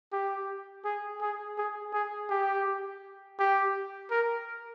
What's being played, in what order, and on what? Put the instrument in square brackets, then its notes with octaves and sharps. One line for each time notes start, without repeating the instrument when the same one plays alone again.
[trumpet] G4
G#4
G#4
G#4
G#4
G4
G4
A#4